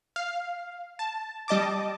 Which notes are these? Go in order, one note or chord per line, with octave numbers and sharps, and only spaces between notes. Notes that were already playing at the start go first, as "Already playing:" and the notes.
F5
A5
G3 D#5 A5 D6